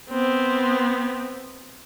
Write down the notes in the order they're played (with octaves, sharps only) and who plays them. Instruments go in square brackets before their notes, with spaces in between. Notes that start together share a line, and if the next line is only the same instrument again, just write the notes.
[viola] B3 C4